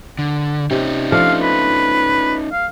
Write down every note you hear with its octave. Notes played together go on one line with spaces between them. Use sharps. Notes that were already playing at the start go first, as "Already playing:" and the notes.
D3
C3 C#4 D#4
F3 A3 D4 F5
B4
F5